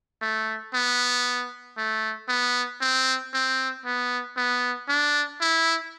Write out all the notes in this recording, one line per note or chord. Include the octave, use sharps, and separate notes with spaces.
A3
B3
A3
B3
C4
C4
B3
B3
D4
E4